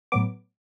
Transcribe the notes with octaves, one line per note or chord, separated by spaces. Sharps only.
A2 F#3 B3 D6